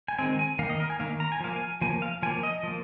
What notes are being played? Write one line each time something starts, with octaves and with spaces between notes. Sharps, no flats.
G#5
D#3 G#3 C4 G#5
G#5
D#3 A#3 F5
D#5
A#4
G#5
D#3 A#3 F5
A#5
G#5
F3 A#3 F5
G#5
F3 A#3 G#5
F5
F3 A#3 G#5
D#5
F3 A#3